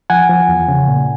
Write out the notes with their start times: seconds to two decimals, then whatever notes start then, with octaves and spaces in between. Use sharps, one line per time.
0.10 F3 F#5 G#5
0.29 F3
0.48 E2
0.68 C#3
0.88 A#2